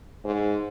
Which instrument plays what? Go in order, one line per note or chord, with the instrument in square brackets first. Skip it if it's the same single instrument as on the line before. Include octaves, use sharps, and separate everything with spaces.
[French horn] G#2